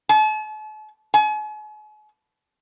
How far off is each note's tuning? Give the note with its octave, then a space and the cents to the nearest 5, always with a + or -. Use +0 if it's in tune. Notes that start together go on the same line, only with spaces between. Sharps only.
A5 -40
G#5 +40